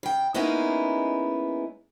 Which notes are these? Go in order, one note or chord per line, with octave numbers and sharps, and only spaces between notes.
C#3 G5
G#3 A#3 B3 C#4 D#4 E4